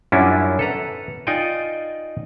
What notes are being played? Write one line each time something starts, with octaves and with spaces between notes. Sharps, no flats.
F#2 G3 C#4 D4 E4 F4
A4 B4 A#5
D#4 F4 D5 D#5 G5 G#5